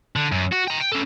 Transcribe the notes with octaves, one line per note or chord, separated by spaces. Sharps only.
D3
F#2
F#4
G5 A#5
G5
C#4 A4